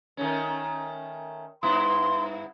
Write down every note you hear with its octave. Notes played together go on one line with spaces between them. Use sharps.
D#3 A3 C#4
G2 B3 E4 C6